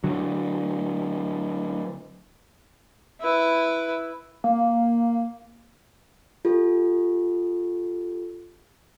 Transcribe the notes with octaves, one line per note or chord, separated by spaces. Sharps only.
D3 F#3
E4 B4
A#3
F4 G4 A4